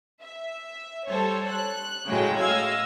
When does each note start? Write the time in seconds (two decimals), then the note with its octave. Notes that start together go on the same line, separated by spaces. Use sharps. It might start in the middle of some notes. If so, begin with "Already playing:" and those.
0.22 E5
1.07 G3 A4 C5 C#5
1.50 F#6
2.08 A2 C#3 F#3 G#3 G5
2.41 D#5 F5 E6 G#6